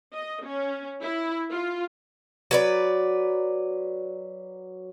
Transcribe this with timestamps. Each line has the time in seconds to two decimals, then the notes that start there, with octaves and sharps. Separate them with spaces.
0.15 D#5
0.46 C#4
1.02 E4
1.52 F4
2.51 F#3 B4 D5